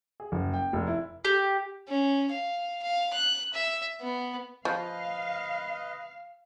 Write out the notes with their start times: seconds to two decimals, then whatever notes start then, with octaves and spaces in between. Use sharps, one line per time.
0.20 G#4
0.32 F#1
0.54 G5
0.73 F1
0.87 E4
1.25 G4
1.88 C#4
2.31 F5
2.83 F5
3.13 F#6
3.53 E5
4.01 B3
4.65 F3 B4 D#5 F5